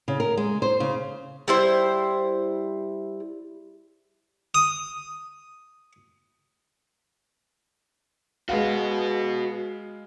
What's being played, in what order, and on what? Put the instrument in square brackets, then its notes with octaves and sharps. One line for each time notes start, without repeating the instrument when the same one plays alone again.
[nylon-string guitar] C#3
A#4
G#3
C5
C#3
[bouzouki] G3 E4 C5
[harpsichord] D#6
[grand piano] G#3 F5 [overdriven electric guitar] F#4 B4